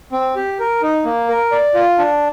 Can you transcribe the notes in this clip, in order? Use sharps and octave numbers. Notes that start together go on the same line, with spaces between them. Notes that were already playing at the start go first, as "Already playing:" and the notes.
C4
G4
A#4
D#4
A#3
A#4
D5
F4
D4